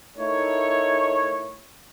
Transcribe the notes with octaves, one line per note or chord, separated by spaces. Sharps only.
A3 D#4 E4 A#4 C#5